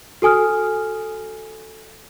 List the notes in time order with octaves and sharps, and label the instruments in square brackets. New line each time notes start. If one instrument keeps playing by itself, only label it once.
[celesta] F#4 A4 G#5 D#6 F6